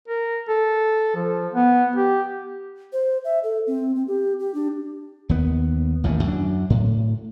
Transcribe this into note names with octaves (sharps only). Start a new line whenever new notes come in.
A#4
A4
F3
B3
G4
C5
E5
A4
C4
C4
G4
G4
D4
D#2 B3
A1 D#2 A2 D#3
F#2 D4
A2